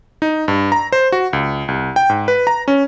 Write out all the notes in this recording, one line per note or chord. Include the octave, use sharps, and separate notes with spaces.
D#4
G2
A#5
C5
F#4
C#2
C2
G5
G#2
B4
A#5
C#4